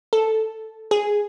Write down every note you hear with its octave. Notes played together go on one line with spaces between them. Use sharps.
A4
G#4